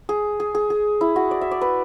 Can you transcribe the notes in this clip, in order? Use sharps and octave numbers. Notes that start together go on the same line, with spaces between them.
G#4
G#4
G#4
G#4
E4
F#4
D5
E5
D5
B4